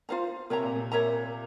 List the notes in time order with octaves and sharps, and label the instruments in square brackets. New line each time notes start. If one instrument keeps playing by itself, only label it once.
[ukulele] F4 C5 F5 A#5
[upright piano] C3 [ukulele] A#4 C#5 E5 A#5
[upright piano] A#2
C3
[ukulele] A#4 C#5 E5 A#5